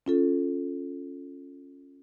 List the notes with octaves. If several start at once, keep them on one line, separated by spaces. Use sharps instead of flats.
C#4 F4 A4